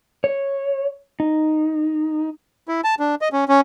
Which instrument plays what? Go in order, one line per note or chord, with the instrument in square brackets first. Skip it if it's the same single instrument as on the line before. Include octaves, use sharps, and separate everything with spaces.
[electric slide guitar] C#5
D#4
[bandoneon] E4
A5
D4
D#5
C#4
C#4